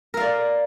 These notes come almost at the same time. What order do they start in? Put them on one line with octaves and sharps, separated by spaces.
A#4 F5 D5